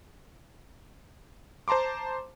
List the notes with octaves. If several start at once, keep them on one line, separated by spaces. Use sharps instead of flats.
C5 A5 A#5 C6 D6